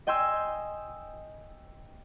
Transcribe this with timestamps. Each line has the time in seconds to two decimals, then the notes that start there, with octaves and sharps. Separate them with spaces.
0.07 D#5 G5 G#5 C6 E6